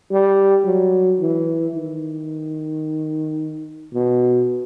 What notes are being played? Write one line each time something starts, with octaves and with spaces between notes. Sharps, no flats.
G3
F#3
E3
D#3
B2